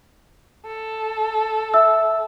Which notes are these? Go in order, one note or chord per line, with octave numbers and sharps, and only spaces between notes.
A4
E5 E6